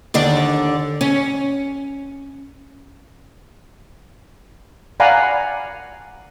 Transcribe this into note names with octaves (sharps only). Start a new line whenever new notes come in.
D#2 D3 D4
C#4
D5 F5 F#5 G#5 A#5 B5